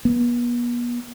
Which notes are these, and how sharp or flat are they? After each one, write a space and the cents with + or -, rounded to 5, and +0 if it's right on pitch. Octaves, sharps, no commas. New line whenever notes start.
B3 -40